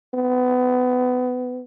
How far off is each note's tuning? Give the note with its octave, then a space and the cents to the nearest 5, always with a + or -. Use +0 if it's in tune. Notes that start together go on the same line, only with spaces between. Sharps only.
B3 +25